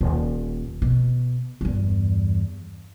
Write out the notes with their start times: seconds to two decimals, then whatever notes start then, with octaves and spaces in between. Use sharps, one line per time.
0.01 D#1
0.82 B2
1.61 E2 G2